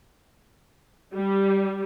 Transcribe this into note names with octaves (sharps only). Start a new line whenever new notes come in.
G3